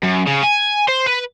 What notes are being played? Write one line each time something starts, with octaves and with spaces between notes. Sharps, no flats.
F#2
C#3
G#5
C5
B4